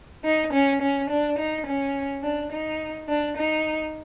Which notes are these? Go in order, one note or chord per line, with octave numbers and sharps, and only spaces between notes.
D#4
C#4
C#4
D4
D#4
C#4
D4
D#4
D4
D#4